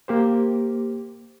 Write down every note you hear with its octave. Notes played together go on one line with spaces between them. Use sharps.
A#3 G4 C5